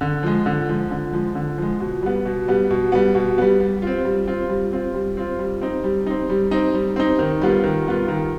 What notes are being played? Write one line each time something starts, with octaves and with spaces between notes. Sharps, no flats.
D3
F3 G#3
D3
F3 G#3
D3
F3 G#3
D3
F3 G#3
B2
G3 B3
B2
G3 B3
B2
G3 B3
B2
G3 B3
G3
C4 F4
G3
C4 F4
G3
C4 F4
G3
C4 F4
G3
C4 D#4
G3
C4 D#4
G3
C4 D#4
G3
C4 D#4
D#3
G3 B3 F4
D#3
G3 B3 F4
D#3